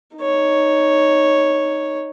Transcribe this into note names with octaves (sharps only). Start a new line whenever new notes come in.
D#4 C#5